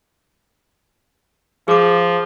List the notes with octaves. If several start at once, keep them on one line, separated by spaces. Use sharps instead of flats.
F3 G#4 D6